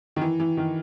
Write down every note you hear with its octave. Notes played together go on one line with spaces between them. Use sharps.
D#3
E3
E3
D#3